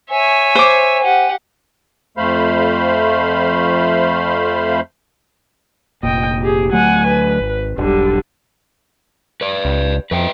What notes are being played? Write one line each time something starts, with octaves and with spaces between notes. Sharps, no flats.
C#5 E5 G#5
C5 D6
G4 F#5
F2 A3 C5 F5 B5
F1 A#2 D#5 G5
G4 G#4
D2 F#3 A3 F#5 G#5
B4
G#1
E1 B1 D3 G3
B4 D5
C#2
F2 B4 E5 G5